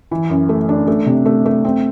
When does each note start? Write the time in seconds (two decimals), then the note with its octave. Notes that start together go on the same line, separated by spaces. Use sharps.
0.11 E3
0.30 F#2
0.49 A3
0.69 D4
0.87 A3
1.06 C3
1.26 A3
1.46 A3
1.65 C4